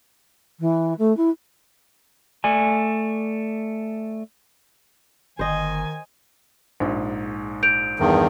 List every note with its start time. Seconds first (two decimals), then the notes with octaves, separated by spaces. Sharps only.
0.60 E3
0.98 A3
1.17 E4
2.44 A3 D5 G#5
5.39 G1 D#3 C5 D#5 G#5
6.80 A#1 G#2
7.63 G6 D7 F7
8.00 E2 G2 D#3